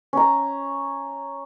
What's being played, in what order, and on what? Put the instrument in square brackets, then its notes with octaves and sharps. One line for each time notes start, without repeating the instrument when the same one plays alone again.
[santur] C#4 A#5